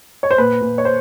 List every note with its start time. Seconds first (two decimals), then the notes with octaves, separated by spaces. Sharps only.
0.23 C#5
0.31 C5
0.38 A#2 B4
0.61 A#2
0.78 C#5
0.85 C5